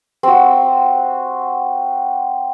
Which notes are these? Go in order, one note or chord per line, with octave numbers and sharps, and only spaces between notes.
C4 F#4